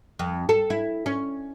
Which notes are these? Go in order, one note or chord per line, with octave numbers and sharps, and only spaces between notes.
F2
A4
E4
C#4